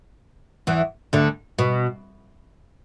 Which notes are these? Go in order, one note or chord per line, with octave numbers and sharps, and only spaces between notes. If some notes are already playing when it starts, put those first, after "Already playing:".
E2 E3
D2 D3
B2